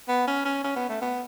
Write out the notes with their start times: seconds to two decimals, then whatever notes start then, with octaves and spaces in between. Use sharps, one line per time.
0.08 B3
0.27 C#4
0.45 C#4
0.64 C#4
0.76 B3
0.89 A3
1.02 B3